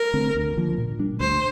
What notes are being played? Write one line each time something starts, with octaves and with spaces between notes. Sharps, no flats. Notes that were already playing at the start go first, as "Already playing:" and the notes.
Already playing: A#4
D3 A3 C4
D2
D3 F3 A#3
A#2
G3 D4
D2 C5